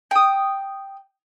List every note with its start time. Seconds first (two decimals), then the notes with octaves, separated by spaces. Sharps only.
0.11 G5 D#6